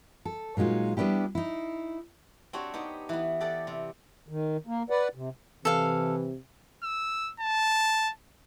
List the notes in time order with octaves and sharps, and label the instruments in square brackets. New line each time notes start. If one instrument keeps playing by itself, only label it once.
[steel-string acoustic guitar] A4
A#2 F#3 G#3 D#4 F4
G3 B3 D4 E4 G4
D#4 E4
[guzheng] C4 D4 F#4 G4 C#5
B3 D#4 G4
E3 B3
G4 A4 D5 F#5
C3
[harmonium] D#3
A#3
B4 D5 F#5
C3
[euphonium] C3 [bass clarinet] E3 [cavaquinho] A4 F5
[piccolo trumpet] E6
A5